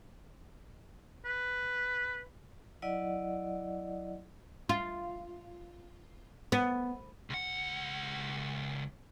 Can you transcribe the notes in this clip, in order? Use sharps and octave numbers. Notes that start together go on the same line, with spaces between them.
B4
F#3 E4 D5 D#5 F#5
F4
B3
C#2 F#5